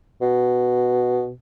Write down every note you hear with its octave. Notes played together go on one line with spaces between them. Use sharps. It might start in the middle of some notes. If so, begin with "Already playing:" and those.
B2